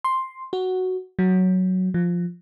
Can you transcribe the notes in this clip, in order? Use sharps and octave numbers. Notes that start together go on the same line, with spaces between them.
C6
F#4
F#3
F3